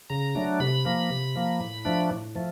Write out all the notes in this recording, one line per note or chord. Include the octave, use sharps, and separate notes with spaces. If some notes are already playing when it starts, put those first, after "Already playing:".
C#3 A#5
F#3 A3 D4
C3 B5
F3 A#3
C3
F3 A#3
A2
F3 A3 D4
A2
F3 A3